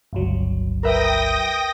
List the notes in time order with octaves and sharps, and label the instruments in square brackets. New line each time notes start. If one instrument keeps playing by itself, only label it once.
[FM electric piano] G1 C#2 F#3
[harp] A#4 B4 E5 [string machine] G5 D#6 A#6